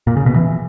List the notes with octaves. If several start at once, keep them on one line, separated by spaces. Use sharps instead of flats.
A#2
C#3
B2
E3